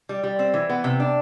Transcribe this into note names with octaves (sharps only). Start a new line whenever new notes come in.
G3
G3
C4
E3
B3
C3
D4